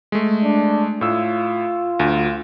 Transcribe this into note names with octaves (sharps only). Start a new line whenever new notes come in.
G#3 A3
D4
A2 F4 E6
D2